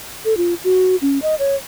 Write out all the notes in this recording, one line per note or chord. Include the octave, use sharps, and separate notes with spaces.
A4
F4
F#4
C#4
D#5
C#5